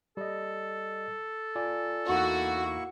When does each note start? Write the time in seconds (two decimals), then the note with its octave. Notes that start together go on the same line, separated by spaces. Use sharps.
0.17 G3 A4 D#5
1.55 F4 D5 G#5
2.09 E2 A#3 D#4 E4 F#4 C#6